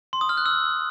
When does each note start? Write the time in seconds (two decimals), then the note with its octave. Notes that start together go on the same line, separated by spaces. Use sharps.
0.13 C6
0.21 D#6
0.29 F6
0.37 F#6
0.46 E6